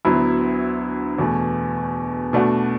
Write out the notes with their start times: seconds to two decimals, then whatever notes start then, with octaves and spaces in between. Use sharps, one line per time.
0.05 D2 D3 F#3 B3 E4
1.18 E2 B2 A3
2.33 B2 A3 D4 F#4